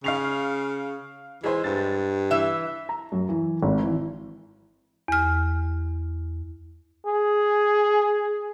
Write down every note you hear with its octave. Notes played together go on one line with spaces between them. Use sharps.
C#3 F5 C7 F7
E3 G#3 G#4 C5
G2 A6
E3 E5
A#5
F#2
E3
G#1
E3
E2 F6
G#4